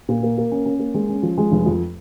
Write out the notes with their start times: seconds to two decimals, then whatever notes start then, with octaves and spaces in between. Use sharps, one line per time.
0.09 A#2
0.23 A#3
0.38 A#3
0.52 C#4
0.66 C#4
0.79 A#3
0.94 G#3
1.09 C#4
1.23 F3
1.38 G#3
1.52 F1
1.66 F2